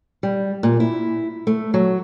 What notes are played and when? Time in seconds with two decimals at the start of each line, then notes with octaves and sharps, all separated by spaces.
0.23 G3
0.63 A#2
0.80 E4
1.47 A3
1.74 F#3